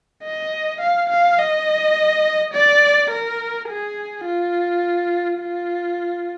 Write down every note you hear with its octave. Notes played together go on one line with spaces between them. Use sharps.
D#5
F5
F5
D#5
D5
A#4
G#4
F4
F4